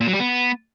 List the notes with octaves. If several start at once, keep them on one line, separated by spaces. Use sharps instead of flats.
A#2
F#3
G3
B3